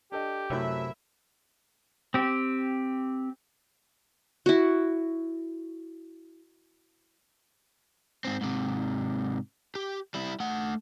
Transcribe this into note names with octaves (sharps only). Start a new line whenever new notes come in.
D4 G4 A4 D#5
F#2 C3 F#3 A3 E4 E5
C4 G4
E4 F#4
G#2 C4
G#2 C3
G4
G3 E4
A3 F#5